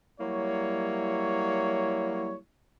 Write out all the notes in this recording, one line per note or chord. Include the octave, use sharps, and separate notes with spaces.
F#3 G3 A#3 E4 C#5